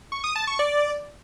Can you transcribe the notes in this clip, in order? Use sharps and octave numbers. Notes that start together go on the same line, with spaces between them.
C#6
D#6
A5
C#6
D5